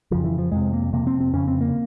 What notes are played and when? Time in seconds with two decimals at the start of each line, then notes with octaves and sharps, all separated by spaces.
0.11 F2 C#3 F3
0.24 E3
0.38 F3
0.51 F2 C3 G#3
0.73 A#3
0.93 F2 C3 A#3
1.07 C4
1.20 C4
1.33 F2 C#3 C#4
1.47 C4
1.61 A#3